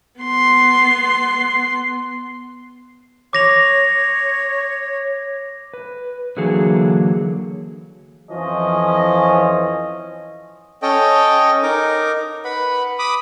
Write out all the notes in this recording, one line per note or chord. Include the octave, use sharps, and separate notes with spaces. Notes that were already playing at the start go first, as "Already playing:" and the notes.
B3 C6
C#5 D6 A#6 F7
B4
D3 E3 F#3 A#3 G#4 A4
F2 E3 F3 C#4 D#5
C#4 A4 C#5 D#5 G5
D#4 A#4 D6
B4 F#5 B5
B5 D6 D#6